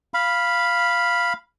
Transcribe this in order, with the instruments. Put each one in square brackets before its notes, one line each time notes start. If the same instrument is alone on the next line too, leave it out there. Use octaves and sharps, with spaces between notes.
[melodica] F5 B5